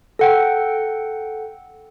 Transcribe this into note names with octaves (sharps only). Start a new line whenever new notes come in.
A4 F#5 G5